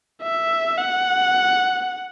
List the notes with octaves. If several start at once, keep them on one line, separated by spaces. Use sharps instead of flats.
E5
F#5